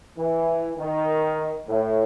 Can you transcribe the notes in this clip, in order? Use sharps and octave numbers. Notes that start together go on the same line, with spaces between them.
E3
D#3
A2